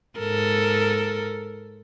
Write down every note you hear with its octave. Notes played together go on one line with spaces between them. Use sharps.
G#2 A4 A#4